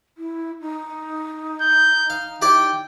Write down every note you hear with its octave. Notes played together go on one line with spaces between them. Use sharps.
E4
D#4
G6
F5
E4 G4 D5 G5